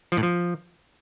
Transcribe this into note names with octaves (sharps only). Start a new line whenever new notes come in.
F3
A2
F3